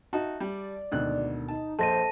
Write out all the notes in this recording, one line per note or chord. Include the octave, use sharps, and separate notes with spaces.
D#4 F#4 E5 A5
G3 D5
G#1 D2 B2 D#3 F#6
D#4 A5
A#1 A4 C5 D#5 A5 A#6 D#7